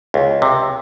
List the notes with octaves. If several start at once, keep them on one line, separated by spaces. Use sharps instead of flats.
C#2
C3